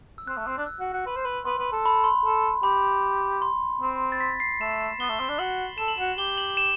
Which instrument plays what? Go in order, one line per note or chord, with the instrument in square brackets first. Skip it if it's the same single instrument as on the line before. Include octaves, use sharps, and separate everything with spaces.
[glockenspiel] E6
[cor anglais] C4 [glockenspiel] F#6
[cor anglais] A3
C4
D4
[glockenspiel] E6
[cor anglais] F#4
F#4
[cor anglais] B4 [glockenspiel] C6
[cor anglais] C5
B4
[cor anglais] B4 [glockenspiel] C6
[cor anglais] B4
A4
[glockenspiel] B5
C6
[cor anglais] A4
[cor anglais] G4 [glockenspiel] B5
[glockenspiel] C6
[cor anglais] C4
[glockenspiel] A6
B6
C7
[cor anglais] A3 [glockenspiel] E7
[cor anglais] B3 [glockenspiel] G7
[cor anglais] A3
C4
D4
[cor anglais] F#4 [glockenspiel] F#7
[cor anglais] A4 [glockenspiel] E7
[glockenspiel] F#7
[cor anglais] F#4 [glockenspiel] E7
[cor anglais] G4 [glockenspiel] G7
[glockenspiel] F#7
E7